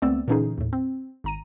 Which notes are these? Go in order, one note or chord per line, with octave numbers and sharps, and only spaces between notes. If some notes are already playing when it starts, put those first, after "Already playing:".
C#2 A3 B3 C4 D5 E6
A#2 D3 E3 C#4 D#4 G#4
D#2 A2
C4
G#1 A#5 D#7